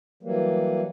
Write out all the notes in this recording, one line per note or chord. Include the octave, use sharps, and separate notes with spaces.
E3 F#3 G3 A#3